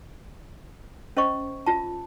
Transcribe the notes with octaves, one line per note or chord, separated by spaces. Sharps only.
C#4 C5 D#5 C#6
F4 A5